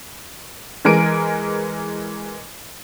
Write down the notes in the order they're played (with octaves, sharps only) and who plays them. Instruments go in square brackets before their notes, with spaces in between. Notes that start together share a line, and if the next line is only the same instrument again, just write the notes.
[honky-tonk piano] E3 G#3 A#4 G#5 D7